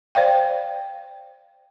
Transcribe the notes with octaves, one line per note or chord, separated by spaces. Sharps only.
C5 D5 F5 G5